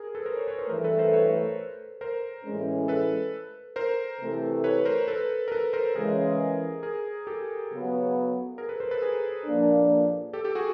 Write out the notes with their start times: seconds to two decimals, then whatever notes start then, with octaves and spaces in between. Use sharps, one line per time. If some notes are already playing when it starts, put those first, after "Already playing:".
Already playing: G#4 A#4
0.15 A4 B4
0.25 A#4 C5
0.36 B4 C#5
0.48 B4 C#5
0.59 A#4 C5
0.69 G2 E3 A3 A#4 C5
0.84 A4 B4
0.99 A#4 C5
1.13 B4 C#5
2.01 A#4 C5
2.45 A2 E3 G#3 C#4
2.88 A4 B4
3.76 A#4 C5
4.20 C3 E3 A3
4.64 B4 C#5
4.85 A#4 C5
5.08 A4 B4
5.48 A#4
5.52 A4 B4
5.73 A#4 C5
5.95 C#3 E3 G#3 C#4 G#4 A#4
6.83 G#4 A#4
7.27 G4 A4
7.70 C#3 F#3 B3
8.58 G#4 A#4
8.69 A4 B4
8.80 A#4 C5
8.91 A4 B4
9.02 G#4 A#4
9.46 A#2 F3 A#3 D4
10.33 G4 A4
10.44 G4 A4
10.55 F#4 G#4